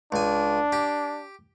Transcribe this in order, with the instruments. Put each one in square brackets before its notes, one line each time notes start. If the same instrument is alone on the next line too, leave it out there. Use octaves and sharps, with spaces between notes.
[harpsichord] C#2 G#5 [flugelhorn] D4
[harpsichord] G4